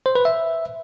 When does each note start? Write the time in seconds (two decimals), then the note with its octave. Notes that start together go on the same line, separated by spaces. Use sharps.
0.06 C5
0.15 B4
0.25 E5